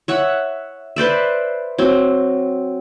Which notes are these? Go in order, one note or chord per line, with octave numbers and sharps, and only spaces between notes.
C#5 E5 F#5
B4 C5 D5 E5
F#3 C4